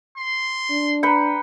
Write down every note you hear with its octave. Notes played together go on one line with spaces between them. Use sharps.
C6
D4
B4 G5 A#5 C#7